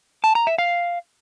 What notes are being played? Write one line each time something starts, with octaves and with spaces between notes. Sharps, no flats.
A5
A#5
E5
F5